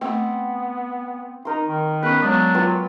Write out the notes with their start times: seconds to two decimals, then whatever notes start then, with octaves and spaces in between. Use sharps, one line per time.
0.01 A3 B3 C4 G5 D6
1.45 D#4 A#4 C6
1.67 D#3
2.03 B3 C#4 G#4 B4
2.22 F#3 G#3 B3 D4 D5
2.55 F4 B4 G5